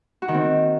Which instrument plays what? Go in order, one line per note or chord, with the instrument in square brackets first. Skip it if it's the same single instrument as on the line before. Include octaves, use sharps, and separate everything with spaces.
[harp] F#4
D#3
C4